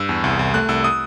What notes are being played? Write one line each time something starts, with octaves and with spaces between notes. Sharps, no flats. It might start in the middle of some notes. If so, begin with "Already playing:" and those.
Already playing: G2 E6
E2
C2
C2
A3 F#6
C2 E6
D#6